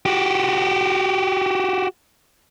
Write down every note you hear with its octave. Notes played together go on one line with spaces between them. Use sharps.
F#4 G4